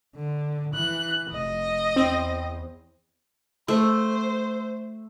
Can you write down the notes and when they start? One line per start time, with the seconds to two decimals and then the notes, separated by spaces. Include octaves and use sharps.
0.16 D3
0.75 E3 F#6
1.32 F1 D#5
1.96 E2 C4
3.68 A3 C5